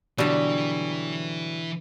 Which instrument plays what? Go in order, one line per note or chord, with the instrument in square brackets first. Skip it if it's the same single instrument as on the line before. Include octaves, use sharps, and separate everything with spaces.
[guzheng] B2 D3 [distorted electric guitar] E3 [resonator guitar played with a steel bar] F#3 G3